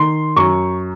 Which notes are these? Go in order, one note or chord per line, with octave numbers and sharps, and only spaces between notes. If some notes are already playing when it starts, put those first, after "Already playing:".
Already playing: D#3 C6
F#2 C#6